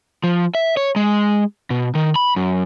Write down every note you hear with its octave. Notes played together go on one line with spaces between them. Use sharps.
F3
E5
C#5
G#3
B2
D#3
B5
F#2